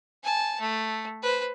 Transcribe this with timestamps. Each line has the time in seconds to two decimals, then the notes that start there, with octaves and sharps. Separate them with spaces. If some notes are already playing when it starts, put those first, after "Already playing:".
0.24 G#5 A5
0.60 A3
1.22 B4 C5